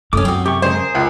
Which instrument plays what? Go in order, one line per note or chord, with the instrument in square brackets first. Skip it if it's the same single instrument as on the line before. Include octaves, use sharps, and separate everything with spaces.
[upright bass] F#2 [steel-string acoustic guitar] A3 C#4 [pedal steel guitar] D6 D#6
[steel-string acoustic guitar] C4 F#4
[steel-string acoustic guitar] C3 [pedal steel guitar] G4 C#6
[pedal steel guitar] C#3 G#3 [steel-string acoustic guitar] A#4 [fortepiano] C5
[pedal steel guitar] G#4
[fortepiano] C#2